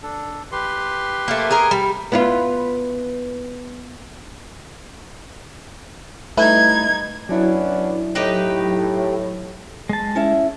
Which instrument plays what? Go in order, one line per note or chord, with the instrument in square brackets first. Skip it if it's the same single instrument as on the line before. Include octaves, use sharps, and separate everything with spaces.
[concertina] D4 A4
G4 B4 C6
[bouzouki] A3 A#3
G#4 A#4
G3
[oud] B3 E4 F4
[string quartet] G3 D#4 G#6 [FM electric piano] A3 E4 B4
[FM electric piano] F#3 E4 [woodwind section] B3 C#4 D4
[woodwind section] A2 [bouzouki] D#4 G4 B4
[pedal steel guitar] G#3 A5
[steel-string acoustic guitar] C#4 E4 E5